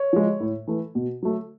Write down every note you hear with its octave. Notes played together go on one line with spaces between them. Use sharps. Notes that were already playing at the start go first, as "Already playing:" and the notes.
Already playing: C#5
F3 G#3
A2
E3 A3
B2
F#3 A3